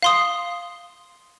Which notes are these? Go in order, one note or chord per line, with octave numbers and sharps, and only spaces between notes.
F5 C6 D#6